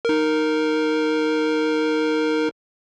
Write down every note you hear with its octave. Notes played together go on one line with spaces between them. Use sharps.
D#4 A#4